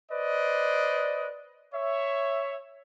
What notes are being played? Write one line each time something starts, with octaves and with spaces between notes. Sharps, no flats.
B4 C5 D5 D#5
C#5 E5